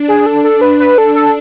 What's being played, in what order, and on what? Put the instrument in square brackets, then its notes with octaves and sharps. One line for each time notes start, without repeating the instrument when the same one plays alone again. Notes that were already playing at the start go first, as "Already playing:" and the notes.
Already playing: [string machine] D4
[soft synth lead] G#4
[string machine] D4 [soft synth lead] A4
[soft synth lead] A4
B4
B4
A4
A4